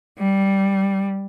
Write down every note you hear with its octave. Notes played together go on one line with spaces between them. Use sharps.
G3